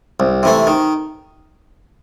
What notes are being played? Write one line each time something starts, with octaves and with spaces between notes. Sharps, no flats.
C2
C3 E3 A3
D#3